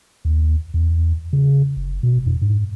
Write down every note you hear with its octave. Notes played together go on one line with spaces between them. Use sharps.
D#2
E2
C#3
F#1
B2
F2
G#2